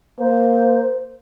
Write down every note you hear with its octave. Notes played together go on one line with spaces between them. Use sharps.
A#3 C5